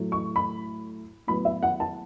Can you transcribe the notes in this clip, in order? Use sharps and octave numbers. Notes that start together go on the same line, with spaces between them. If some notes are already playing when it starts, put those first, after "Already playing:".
Already playing: A2 F#3 A3
C#6
B5
A2 F#3 B3 B5
E5
F#5
A5